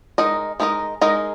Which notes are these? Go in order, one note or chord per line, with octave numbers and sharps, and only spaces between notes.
G#3 D#4 A#4 D#5
G#3 D#4 A#4 D#5
G#3 D#4 A#4 D#5